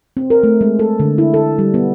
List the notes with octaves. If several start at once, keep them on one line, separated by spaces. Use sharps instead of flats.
C4
A#4
A3
G#3
A4
D3
E4
A4
G3
B3